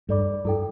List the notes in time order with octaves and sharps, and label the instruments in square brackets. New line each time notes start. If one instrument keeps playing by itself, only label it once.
[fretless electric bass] G2 [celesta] A4 D5 B5 D6
[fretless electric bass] G2 [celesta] E4 A4 G5